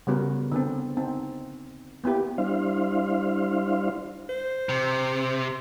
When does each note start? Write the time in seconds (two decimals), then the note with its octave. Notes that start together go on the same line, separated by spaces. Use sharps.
0.07 C#3 G3 B3 F#4 A#4
0.52 D3 B3 C4
0.97 C4 D#4
2.04 A#3 B3 E4 G4
2.38 G3 D4 E4 C5 F5
4.29 C5
4.69 C3